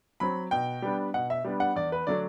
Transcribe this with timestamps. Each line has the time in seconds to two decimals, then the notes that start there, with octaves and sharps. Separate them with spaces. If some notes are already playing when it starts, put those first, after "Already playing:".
0.20 F#3 C4 B5
0.51 B2 G5
0.82 G3 B3 D4
1.14 B2 F#5
1.30 E5
1.44 G3 B3 D4
1.60 F#5
1.76 E2 D5
1.92 B4
2.07 D3 F#3 A3 D4 D5